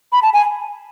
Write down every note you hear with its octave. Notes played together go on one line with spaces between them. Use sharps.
B5
A5
G#5